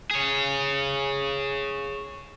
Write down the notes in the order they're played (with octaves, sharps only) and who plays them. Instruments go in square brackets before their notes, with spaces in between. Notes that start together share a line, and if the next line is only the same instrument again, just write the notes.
[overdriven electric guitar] G#4 C#5